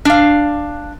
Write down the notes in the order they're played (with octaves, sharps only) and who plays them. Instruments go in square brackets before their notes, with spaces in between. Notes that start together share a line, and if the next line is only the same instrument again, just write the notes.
[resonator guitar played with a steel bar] D4 F5